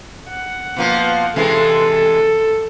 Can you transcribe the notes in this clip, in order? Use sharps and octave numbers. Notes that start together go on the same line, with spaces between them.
F#5
B2 F3 A#3
C3 E3 G#3 A4